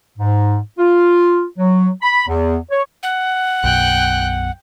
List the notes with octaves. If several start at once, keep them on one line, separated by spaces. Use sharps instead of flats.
G#2
F4
F#3
B5
E2
C#5
F#5
B1 F#2 B2 G5 F#6